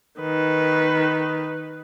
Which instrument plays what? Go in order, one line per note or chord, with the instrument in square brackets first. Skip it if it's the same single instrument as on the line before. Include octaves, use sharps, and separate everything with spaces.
[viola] D#3 B4